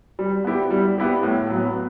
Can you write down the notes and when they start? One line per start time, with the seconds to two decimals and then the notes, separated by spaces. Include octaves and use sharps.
0.19 G3
0.44 B3 E4 G4
0.71 G3
0.98 B3 E4 G4
1.23 A2
1.50 F#3 B3